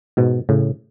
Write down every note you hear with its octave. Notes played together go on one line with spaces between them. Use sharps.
G#2 B2
A2 C#3